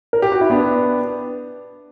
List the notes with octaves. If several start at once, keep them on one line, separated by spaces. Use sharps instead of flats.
A#4
G4
F#4
E4
B3 D4